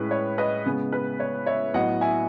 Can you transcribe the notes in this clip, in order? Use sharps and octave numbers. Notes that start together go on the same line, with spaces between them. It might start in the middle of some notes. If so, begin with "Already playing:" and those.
Already playing: A2 G#3 C#4 B4
C#5
B4 D#5
C#3 G#3 B3
B4
C#5
C#5 E5
A2 F#3 B3 D#5 F#5
E5 G#5